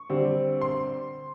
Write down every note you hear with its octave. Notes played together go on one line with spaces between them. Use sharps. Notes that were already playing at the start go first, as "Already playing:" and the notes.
Already playing: C#6
D3 G3 C4
C6